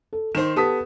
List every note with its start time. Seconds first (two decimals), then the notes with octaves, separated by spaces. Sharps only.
0.13 A4
0.35 D#3 C5 E7
0.56 B3 G4 A4 A5 D#6 B6